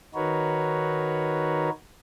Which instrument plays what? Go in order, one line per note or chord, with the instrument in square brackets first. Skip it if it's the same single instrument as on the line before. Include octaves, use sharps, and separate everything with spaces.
[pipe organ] D#3 D#4 F#4 A#4 B4 C#5